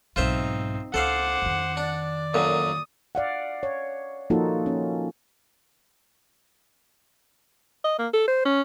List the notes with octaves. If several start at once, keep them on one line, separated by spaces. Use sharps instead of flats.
B1 G#2 C4 D#4 F4 C5 E5
C#2 A4 C5 D5 F5 F#5 D6
F2 D#3
D4 D5
F#2 A#2 D3 D#6
D5 F5 F#5
C#5
F3 A#3 D#4 F4 F#4 A4
C#4
D#5
A#3
A4
C5
C#4